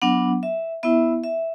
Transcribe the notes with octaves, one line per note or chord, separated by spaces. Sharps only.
F#3 B3 D4 F#5
E5
B3 E4 E5
E5